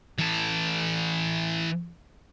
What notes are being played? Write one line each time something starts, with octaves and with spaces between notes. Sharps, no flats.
E3 A4